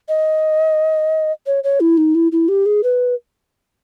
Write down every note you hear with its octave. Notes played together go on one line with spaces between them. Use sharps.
D#5
C#5
C#5
E4
D#4
E4
E4
G4
G#4
B4